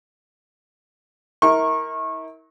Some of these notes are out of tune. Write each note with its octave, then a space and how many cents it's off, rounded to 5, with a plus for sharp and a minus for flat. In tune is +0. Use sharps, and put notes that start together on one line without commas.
E4 -40 A#4 -5 C#6 -30